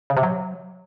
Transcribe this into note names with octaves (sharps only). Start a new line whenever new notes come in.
C#3
C3
F#3